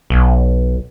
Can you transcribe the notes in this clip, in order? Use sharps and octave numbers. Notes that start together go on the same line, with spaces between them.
B1